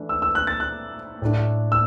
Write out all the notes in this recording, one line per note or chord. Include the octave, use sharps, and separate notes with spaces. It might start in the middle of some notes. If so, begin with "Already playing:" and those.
Already playing: E3 A3 D4
E6
E6
F#6
A6
F#6
A2 A3 D4
E6